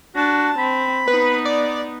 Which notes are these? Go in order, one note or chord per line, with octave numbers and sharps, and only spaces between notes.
D4 F#4 A5
C4 B5
B3 D#4 B4
D5